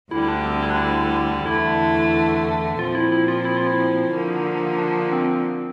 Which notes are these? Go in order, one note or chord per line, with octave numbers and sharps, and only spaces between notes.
D2 D3 G3 E4
E4
D4
C4
E4
D4
E4
E2 D3 A3 E4
A#2 F3 C4 F4
E4
E4
F4
E4
F4
E4
D3 F3 A#3
D4
C4